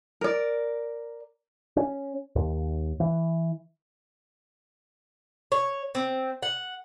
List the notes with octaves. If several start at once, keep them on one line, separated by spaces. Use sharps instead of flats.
A#4 D5
C#4
D#2
E3
C#5
C4
F#5